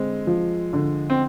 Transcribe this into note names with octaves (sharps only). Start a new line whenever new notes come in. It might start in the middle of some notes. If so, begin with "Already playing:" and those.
Already playing: D3 G#3 C4
F3
D3
C4